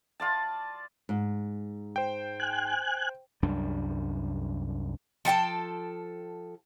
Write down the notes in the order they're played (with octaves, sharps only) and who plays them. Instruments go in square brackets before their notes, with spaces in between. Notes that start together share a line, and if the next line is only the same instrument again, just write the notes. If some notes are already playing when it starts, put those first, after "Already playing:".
[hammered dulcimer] F4 D5 A5
[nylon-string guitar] G#2
[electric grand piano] C5 G5
[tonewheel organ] G#5 F#6
[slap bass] C2 F#2 G3 D4
[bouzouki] F3 A4 G5 A5